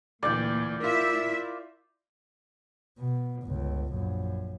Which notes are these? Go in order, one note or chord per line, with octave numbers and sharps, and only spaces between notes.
D2 A#2 E3 D5 G5
E4 F4 A#4 E5
B2
G1 C#2
A#1 F#2